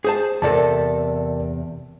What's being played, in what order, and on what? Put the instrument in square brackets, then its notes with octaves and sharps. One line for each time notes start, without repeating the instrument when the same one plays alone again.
[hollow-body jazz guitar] G#4 C5 A5
[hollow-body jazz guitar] E2 C3 A4 [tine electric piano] A#4 D5 A5